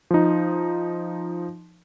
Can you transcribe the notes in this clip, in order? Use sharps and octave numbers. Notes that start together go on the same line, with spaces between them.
F3 D#4